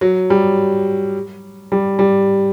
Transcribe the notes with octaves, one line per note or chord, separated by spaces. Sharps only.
F#3
G3
G3
G3